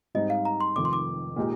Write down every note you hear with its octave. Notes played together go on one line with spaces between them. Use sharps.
G#2 G3 C4 D#4 D#5
F5
A#5
C6
F1 F2 D#3 D6
C6
D6
A#2 G#3 D#4 G4